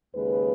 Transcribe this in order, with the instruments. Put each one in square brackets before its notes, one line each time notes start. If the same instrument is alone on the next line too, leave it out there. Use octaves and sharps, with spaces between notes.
[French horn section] D#2 C#3 G#3 B4